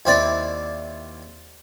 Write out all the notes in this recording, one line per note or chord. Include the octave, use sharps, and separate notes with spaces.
D#2 C4 E4 D5